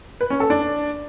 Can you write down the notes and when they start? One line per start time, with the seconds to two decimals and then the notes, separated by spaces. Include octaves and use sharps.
0.21 B4
0.30 C#4
0.40 A4
0.50 D4